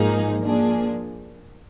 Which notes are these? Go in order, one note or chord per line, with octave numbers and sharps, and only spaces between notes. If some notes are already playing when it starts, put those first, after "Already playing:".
Already playing: G#2 F3 A#3 D#4 G#4
F3 A#3 D4 G#4